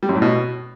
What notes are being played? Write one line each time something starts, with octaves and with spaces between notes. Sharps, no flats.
G3
F#2
A2
B2